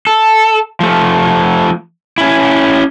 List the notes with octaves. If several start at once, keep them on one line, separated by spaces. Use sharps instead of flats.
A4
F3 A3
C#4 E4